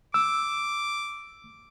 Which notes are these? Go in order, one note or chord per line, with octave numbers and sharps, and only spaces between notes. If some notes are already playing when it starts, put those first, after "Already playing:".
D6 E6